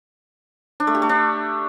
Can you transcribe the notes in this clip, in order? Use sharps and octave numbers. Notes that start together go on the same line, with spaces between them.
D4
A3
G4
A3
D4